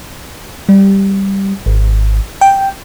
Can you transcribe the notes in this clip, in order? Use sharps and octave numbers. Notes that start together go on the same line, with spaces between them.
G3
G#1
G5